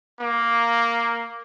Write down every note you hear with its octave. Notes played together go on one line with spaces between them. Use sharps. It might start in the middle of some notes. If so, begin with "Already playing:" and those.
A#3